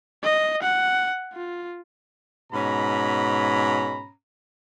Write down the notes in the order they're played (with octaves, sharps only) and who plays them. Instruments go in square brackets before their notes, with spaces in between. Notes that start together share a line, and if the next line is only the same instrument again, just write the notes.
[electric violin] D#5
F#5
F4
[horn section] G#2 B2 C#4 A#5 B5